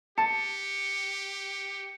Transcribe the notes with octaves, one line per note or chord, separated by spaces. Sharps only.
G4 A5 C#7